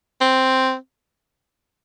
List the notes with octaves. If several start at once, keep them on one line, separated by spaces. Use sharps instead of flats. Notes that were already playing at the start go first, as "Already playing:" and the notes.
C4